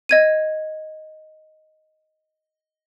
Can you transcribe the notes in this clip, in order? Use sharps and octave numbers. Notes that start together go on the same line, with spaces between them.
D#5 G#6 D#7